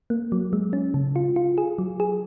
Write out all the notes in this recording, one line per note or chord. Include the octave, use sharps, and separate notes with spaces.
A#3
F#3
G#3
C#4
C#3
F4
F4
G#4
F#3
G#4